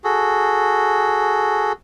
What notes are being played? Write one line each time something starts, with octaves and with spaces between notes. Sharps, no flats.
F#4 G#4 A4